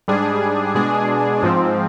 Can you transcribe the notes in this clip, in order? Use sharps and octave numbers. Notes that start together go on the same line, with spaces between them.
G#2 G3 D4 G#4
B2 G#3 D4 G#4
G#2 F3 C4